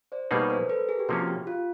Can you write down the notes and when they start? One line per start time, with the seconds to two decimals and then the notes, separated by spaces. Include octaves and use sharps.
0.12 C5 D5
0.31 B2 G3 A#3 D#4 G#4 B4 C#5
0.50 A#4 C5
0.69 A4 B4
0.89 G#4 A#4
0.99 G4
1.09 C3 F3 A#3 C#4 F#4
1.28 G4
1.47 F4